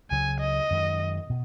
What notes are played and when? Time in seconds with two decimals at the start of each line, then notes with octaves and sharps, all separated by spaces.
0.10 C#2 C#3 F#3 G#5
0.41 D#5
0.70 F#2 D#3 G#3
1.30 B2